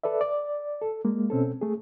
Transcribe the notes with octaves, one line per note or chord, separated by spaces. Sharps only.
A4 B4 D5 E5
D5
A4
G#3 A#3
B2 C4 C#4 A4
A3 G#4